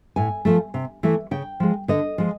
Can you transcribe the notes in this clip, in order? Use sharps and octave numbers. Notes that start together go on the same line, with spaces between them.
A2 G#5
F3 A3
C3
E3 A3
C#3 G5
F3 G#3
D3 D#5
F3 G#3